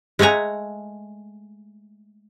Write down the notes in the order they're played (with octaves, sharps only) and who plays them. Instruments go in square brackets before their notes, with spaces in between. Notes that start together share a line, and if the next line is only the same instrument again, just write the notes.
[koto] G#3 A3 F#5 G#5 A#5